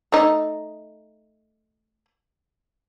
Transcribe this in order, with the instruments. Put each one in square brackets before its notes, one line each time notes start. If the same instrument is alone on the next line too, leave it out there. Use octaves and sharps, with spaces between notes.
[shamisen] A3 D#4